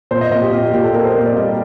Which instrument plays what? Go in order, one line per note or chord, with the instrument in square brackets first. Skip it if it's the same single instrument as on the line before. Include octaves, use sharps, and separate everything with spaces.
[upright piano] A#2 C5
D#5
A#2 D#5
G4
A#2 F4
G4
A#2 G4
A4
A#2 A#4
C5
A#2
D5
G3 D#5